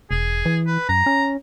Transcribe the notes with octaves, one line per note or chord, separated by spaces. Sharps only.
E1 G#4
E3
B4
F#2 A#5
C#4